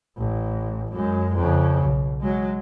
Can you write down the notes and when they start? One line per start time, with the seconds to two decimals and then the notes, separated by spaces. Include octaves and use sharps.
0.17 A1
0.92 F#2 G#3
1.35 F2 C#3
1.84 B1
2.20 F#3 G#3